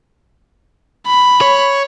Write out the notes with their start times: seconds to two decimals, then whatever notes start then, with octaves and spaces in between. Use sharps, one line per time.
1.07 B5
1.41 C#5